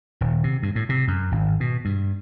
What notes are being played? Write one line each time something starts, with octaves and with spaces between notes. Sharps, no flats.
D#1
C3
G2
A2
C3
F#2
G#1
B2
G2